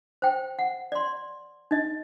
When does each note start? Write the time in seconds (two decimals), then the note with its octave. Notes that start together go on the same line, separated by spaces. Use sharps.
0.22 C5 G5
0.59 F#5
0.92 D5 C6
1.71 D#4 D#5